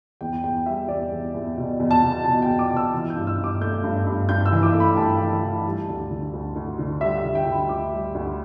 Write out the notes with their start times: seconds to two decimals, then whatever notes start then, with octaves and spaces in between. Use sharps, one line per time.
0.21 E2 G5
0.43 E2 G5
0.66 G3 E5
0.88 E2 D5
1.11 E2
1.34 E2
1.57 B2
1.80 E2
1.91 A5
2.02 B2
2.24 B2 A5
2.42 G5
2.48 E2
2.59 D6
2.70 B2
2.76 E6
2.93 E3
3.10 G6
3.15 G2
3.27 E6
3.38 G2
3.44 D6
3.61 A3 G6
3.84 G2
4.06 G2
4.29 G2 G6
4.45 E6
4.52 E3
4.63 D6
4.74 A3
4.80 B5
4.93 G5
4.97 G2 A5
5.20 E3
5.43 E3
5.65 G3
5.88 D2
6.10 D3
6.33 D2
6.56 D2
6.79 D3
7.01 G3 E5
7.18 E5
7.24 D3
7.35 G5
7.46 D3
7.52 B5
7.69 D2 D6
7.92 G3
8.14 D2